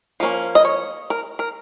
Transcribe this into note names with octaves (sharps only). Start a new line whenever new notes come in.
F3 A#3 C#4
D#5
C#5
A#4
A#4